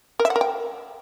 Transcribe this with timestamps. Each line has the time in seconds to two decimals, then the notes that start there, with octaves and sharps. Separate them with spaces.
0.19 A#4
0.25 E5
0.30 F#5
0.36 A#4
0.41 G5